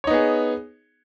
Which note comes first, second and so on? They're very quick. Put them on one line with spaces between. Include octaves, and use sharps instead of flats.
C#5 D#4 B3 G#4